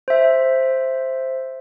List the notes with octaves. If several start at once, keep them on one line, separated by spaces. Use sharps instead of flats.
C5 E5